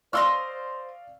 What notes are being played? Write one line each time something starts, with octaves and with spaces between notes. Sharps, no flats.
C5 D5 D#5 F5 C6 C#6 E6 F6